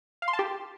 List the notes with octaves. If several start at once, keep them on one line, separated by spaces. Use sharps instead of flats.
F5
C6
A5
G4